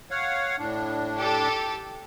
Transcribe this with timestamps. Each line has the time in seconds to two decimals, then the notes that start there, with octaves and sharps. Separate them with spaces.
0.11 C#5 F5 F#5
0.59 A2 D4
1.17 G4 A4